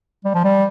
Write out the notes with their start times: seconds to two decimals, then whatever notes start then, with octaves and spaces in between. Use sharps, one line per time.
0.25 G3
0.35 F3
0.44 G3